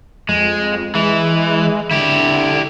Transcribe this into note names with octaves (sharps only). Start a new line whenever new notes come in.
F2 G#3
E3 G#3
D3 E4 G4